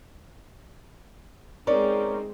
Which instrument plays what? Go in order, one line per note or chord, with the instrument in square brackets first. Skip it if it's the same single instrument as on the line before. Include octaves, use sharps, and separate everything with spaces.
[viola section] G#3 C4 D#4 [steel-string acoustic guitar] C#4 A#4 D5